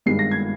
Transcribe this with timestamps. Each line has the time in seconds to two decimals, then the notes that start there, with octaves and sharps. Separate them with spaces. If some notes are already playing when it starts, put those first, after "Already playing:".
0.06 G#1 G2 D#3 G#3 C7
0.19 A#6
0.31 G#6